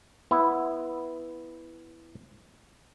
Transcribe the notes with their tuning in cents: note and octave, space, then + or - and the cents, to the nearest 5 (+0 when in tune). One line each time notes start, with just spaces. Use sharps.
B3 +0 E4 +0